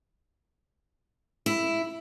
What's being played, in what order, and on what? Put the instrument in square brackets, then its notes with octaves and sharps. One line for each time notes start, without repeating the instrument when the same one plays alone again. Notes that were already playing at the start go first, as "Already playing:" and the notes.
[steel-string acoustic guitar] E4